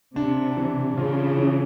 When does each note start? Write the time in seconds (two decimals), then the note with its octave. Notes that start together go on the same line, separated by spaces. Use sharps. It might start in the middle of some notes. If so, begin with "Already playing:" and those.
0.16 C3 D4
0.57 E3
0.97 C#3 F4
1.38 E3